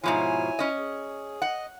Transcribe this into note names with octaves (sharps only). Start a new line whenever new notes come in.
G#2 B2 F3 E4 C#5 G#5
C#4 D#5
G#4
D#5 F#5